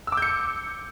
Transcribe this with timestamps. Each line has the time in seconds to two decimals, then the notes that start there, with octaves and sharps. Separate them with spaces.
0.07 E6
0.12 D6
0.17 G6
0.22 C#7